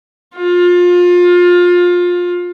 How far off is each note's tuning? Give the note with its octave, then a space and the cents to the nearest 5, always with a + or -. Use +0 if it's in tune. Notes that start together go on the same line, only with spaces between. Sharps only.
F4 +25